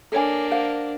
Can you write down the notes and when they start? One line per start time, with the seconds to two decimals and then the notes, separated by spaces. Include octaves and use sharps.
0.12 A#3 D4 A4 C#5 G#5
0.51 C5 F5 F#5